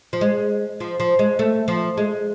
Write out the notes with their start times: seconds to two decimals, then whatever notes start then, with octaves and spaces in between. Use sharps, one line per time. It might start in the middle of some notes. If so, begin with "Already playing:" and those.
0.13 F3
0.21 G#3
0.80 F3
1.00 F3
1.19 G#3
1.39 A3
1.68 F3
1.97 G#3